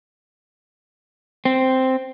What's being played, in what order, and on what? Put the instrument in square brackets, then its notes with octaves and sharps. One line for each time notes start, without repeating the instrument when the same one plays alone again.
[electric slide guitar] C4